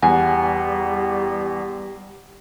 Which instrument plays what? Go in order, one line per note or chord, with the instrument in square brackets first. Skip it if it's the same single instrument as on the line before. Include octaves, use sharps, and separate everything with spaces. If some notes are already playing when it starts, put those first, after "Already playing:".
[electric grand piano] E2 [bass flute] G3 [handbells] F#5 [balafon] G#5